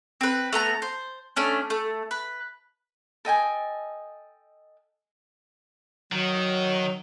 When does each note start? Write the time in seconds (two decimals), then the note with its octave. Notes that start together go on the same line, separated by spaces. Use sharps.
0.21 C4 B4
0.53 A3 B3 A#5
0.82 C5
1.36 A3 C#4 D4
1.70 A3
2.11 B4
3.25 A4 D#5 G5 G#5
6.12 D#3 F#3